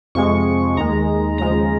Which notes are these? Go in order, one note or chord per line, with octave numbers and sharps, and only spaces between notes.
F2 C3 F3 G#3 C#6
D#2 D#3 G#3 A#5
D#2 C#3 F3 G#3 A#5